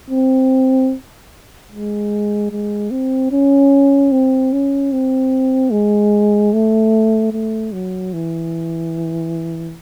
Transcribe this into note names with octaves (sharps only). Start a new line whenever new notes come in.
C4
G#3
G#3
C4
C#4
C4
C#4
C4
G#3
A3
A3
F#3
E3